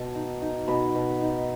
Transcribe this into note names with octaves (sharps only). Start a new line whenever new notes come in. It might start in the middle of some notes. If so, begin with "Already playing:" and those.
Already playing: B2 A5
D#4
D#4
B2 B5
B2
D#4